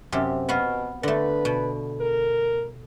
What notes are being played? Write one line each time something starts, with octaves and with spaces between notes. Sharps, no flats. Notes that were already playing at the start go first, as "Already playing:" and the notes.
F#2 C3 G4
B2 B3 F#4 F5
D3 A3 B4
B2
A#4